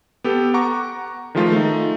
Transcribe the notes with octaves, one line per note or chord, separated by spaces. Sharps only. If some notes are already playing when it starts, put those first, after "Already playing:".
B3 G4 A4
F#5 A#5 C#6 D6
D#3 F3 G#3 A3 F4
A3 D#4